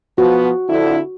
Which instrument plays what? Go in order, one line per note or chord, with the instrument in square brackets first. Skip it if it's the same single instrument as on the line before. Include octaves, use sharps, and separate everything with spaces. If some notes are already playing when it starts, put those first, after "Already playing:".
[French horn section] F3 B3 [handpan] F#4
[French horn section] F2 D3 E4